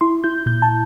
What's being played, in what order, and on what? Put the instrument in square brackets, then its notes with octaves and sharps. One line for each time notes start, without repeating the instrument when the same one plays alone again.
[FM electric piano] E4 C6
E4 G6
A#2 G6
A5